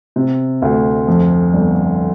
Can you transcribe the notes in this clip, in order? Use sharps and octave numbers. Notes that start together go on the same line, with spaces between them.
C3
D2
F2
G1